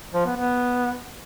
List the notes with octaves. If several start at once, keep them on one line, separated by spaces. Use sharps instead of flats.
F3
B3
B3